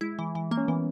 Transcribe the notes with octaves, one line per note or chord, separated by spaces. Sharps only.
G#3 E4
E3
E3
A#3
C#4
E3 B3